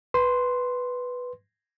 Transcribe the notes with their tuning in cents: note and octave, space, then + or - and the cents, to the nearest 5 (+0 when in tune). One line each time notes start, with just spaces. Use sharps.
B4 +0 C6 +0